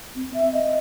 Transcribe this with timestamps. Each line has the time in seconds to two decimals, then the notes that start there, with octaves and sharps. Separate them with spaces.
0.16 C4
0.34 E5
0.53 D#5